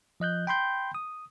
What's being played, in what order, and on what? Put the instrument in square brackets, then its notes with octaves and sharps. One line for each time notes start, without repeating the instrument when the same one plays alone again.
[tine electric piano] F3 D#5 F#6 G6
G5 B5 C6 G6
D#6